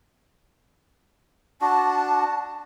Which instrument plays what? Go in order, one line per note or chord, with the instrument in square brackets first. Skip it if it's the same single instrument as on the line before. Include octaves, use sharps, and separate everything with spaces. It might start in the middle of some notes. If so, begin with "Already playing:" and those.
[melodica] D4 F#4 [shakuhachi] A5